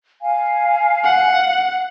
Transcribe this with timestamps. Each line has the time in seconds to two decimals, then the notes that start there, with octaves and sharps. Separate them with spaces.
0.22 F5 G#5
1.04 F#5